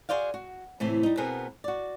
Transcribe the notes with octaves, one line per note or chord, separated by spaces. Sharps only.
F#4 G#4 A#4 C5 D5 F5
F#4
A2 C3 E3 A3
G3 D#4
B2 B3 C4 G#4 A#4
F#4 D5